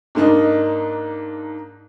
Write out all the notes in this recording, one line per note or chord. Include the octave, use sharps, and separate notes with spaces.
G#2 A#3 D4 D#4